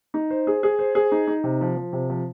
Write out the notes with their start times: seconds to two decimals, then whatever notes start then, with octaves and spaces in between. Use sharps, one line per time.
0.14 D#4
0.30 C5
0.47 G#4
0.63 G#4
0.79 C5
0.95 G#4
1.12 D#4
1.27 D#4
1.44 C3
1.61 F3
1.77 F3
1.93 C3
2.10 F3